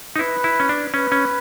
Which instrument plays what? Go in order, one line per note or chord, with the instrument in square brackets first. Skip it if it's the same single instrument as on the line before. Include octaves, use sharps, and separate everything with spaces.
[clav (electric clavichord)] D#4
[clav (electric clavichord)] E4 [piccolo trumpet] B4
[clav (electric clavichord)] E4
C#4
D4
[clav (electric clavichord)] C#4 [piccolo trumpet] B4
[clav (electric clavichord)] C#4